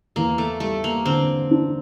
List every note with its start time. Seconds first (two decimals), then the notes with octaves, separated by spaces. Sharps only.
0.16 E2 A#3
0.38 A3
0.60 G3 A3
0.84 A#3
1.06 D3 C4
1.51 D4